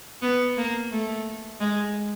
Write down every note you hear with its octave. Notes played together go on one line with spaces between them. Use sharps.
B3
A#3
A3
G#3